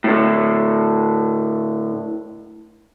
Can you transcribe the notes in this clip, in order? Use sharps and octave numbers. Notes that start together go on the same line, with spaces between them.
A2 D3